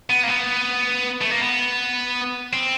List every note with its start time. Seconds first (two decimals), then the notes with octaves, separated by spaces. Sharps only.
0.10 B3
0.23 A#3
0.29 B3
1.22 A3
1.31 A#3
1.41 B3
2.53 C4